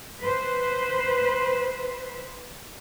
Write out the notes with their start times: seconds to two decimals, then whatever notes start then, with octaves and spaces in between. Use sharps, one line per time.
0.20 B4 C5